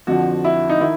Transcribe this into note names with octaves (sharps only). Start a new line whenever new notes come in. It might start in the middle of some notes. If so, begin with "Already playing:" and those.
F2 D3 F3 F#4
E4
D#4
D#3 E4